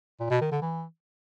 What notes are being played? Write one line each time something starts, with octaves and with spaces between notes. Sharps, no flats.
A#2
B2
D#3
D3
E3